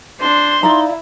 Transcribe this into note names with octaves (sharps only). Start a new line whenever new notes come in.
D4 C5 C6
D#4 E4 D5 F5 A#5